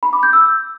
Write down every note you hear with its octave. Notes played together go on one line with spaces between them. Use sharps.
B5
D6
G6
E6